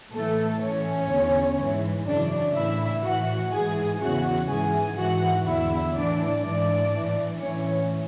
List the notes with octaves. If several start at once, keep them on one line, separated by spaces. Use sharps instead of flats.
A2 E3 A3 A4
A2 E3 C#4 C#5
E2 D3
G#2 E3
F#2 C#3 E3 D4 D5
A2 E3 E4 E5
A2 E3 F#4 F#5
G#2 E3 G#4 G#5
E2 C#3 E3 F#4 F#5
G#2 E3 G#4 G#5
G#2 E3 F#4 F#5
E2 D3 E4 E5
A2 E3 D4 D5
G#2 E3 D4 D5
A2 E3
A2 E3 C#4 C#5